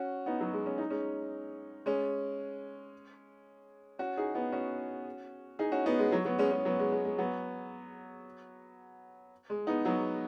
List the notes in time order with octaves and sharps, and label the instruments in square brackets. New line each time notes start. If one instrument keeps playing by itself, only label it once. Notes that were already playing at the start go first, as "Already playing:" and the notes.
Already playing: [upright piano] C#4 F#4
B3 D#4
F#3
G#3
C#4
D#4
G#3 C#4
G#3 C#4
C#4 F#4
D#4 G#4
B3 D#4
C#4 F#4
D#4 G#4
C#4 F#4
B3 D#4
G#3
F#3
F#3 B3
G#3 C#4
G#3 C#4
F#3 B3
G#3
G#3
G#3
F#3 B3
G#3
B3 D#4
F#3 B3